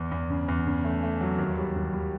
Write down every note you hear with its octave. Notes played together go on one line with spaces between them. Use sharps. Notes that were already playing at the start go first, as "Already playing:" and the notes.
Already playing: E2
E2
C#3
E2
C#3
A3
A3
F#3
D#2
G3
D#2
G3